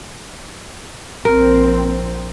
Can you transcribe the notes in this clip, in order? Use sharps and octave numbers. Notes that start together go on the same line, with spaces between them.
A#1 C4 A#4